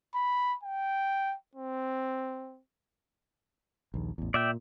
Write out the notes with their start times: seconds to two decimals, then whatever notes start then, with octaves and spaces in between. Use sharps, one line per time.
0.15 B5
0.63 G5
1.55 C4
3.94 A#1 D#2
4.18 A1 E2
4.34 A#2 D5 E5 G5